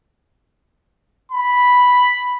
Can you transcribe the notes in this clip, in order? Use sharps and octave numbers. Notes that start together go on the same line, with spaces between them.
B5